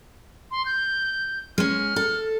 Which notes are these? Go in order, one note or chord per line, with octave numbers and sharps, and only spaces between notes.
C6
G6
G#3 C#4 F6
A4